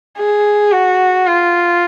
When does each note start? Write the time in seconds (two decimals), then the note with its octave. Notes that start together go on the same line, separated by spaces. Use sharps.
0.18 G#4
0.72 F#4
1.27 F4